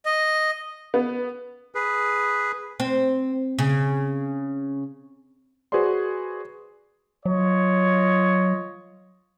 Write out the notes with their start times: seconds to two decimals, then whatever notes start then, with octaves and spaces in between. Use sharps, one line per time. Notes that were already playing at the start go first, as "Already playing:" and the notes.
0.06 D#5
0.94 B3
1.75 G#4 B4
2.80 C4
3.59 C#3
5.72 F#4 G#4 B4 C5 D5 C6
7.25 F#3 F4 C#5 D#5